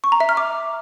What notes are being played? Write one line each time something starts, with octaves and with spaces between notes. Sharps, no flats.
C#6
A#5
E5
F6
D6